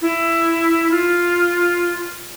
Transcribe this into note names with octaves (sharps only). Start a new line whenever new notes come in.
E4
F4